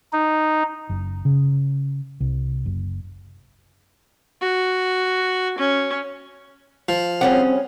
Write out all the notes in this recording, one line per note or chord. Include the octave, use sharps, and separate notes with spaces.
D#4
F#1
C#3
C2
F#1
F#4
C#4
F3
G3 C4 C#4 G#4 F#5